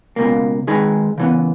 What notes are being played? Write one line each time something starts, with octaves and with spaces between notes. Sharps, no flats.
C#2 B2 A#3
D#3 G#3 D#4 G#4 B4
C#3 E3 B3